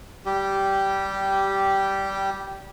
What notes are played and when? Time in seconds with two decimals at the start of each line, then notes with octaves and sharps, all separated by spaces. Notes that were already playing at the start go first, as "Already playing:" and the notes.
0.26 G3 G4